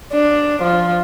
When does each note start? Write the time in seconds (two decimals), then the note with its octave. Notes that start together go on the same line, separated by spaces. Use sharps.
0.12 D4
0.62 F3